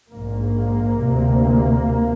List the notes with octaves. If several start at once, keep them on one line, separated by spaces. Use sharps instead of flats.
A#1 G#2 A#3
D2 C3